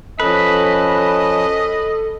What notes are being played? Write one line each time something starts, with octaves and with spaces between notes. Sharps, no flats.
F3 C#4 A4 B4 D#5 A5